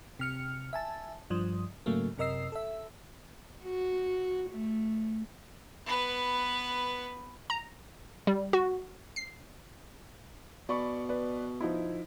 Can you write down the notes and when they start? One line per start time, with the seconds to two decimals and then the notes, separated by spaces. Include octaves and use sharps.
0.19 C3 F6 C#7
0.73 E5 G#5 A5
1.30 G2 F3 D#6
1.86 G#2 C#3 F#3 A3 A#3
2.18 F#2 C3 A#4 D#5 E6 C7
2.52 A4 E5
3.63 F#4
4.50 A3
5.86 B3 B4
7.50 A#5
8.27 G3
8.53 F#4
9.16 C7
10.69 B2 D5 B5 C#6
11.09 B4 D5
11.61 F3 D#4 E4